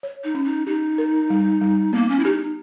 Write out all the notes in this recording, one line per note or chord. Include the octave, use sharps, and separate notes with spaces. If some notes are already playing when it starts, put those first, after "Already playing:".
C#5
D#4
C#4
D#4
D#4 G4
A#4
G3
G3
A#3 B3
C#4
E4
D#4 G4